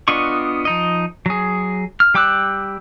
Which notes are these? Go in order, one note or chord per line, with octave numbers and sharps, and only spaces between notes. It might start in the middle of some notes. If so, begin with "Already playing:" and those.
B3 D4 F4 D#5 C#6
F3 D#4 D#5
F#3 G#4
F6
G3 G5 D6 E6 F#6